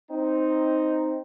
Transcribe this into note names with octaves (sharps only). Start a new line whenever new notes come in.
C4 D#4